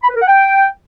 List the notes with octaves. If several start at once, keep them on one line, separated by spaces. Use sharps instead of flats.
B5
B4
A#4
F#5
G5